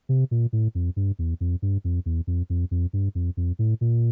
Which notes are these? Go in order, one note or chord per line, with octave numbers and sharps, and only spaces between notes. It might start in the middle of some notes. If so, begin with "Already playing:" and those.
C3
A#2
A2
F2
G2
E2
F2
G2
F2
E2
F2
F2
F2
G2
F2
F2
A2
A#2